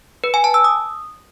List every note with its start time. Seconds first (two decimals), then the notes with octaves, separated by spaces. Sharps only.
0.24 B4
0.34 G#5
0.44 A5
0.54 E6
0.64 D#6